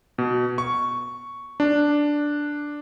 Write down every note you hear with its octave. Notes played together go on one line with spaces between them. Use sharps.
B2
C#6
D4